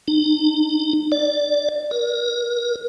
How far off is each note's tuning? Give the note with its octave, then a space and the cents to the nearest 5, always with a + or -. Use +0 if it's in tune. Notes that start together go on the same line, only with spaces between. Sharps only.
D#4 -40
D5 +0
A#4 +35